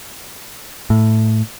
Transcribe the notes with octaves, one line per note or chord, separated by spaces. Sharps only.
A2